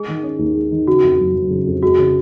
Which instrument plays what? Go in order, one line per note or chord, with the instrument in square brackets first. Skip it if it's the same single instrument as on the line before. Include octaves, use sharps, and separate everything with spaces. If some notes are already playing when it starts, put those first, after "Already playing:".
Already playing: [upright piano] G#3 [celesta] G#4
[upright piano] D#3
C#4
D#2
G#3
D#3
[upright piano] C#3 [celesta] F#4
[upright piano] F2
F#1
F#1
C#3
F2
[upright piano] G#3 [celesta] F#4
[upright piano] C#3